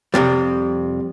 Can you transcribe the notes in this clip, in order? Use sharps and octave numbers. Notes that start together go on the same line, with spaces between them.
F2 A2 C3 G3